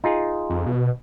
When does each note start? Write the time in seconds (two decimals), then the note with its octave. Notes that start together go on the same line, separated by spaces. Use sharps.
0.04 D#4 F4 G#4
0.50 F2
0.66 B2